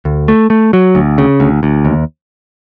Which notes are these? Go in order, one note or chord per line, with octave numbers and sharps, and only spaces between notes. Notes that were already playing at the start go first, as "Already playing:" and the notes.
D2
A3
A3
F#3
D2
C#3
D2
D2
D#2